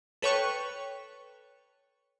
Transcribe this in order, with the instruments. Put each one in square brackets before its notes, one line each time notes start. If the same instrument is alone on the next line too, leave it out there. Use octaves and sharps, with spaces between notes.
[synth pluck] A4 B4 C#5 G5 C#6 F#6